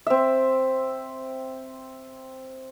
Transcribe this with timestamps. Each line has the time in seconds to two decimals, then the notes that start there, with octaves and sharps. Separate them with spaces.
0.07 C4 E5